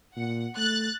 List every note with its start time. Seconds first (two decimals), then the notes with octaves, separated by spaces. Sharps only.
0.16 A#2 F#5
0.57 A3 F#6 A6